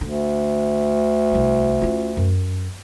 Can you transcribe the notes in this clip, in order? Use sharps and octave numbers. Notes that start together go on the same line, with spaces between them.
D2 D3
C2 G3
C#4 F4
F#2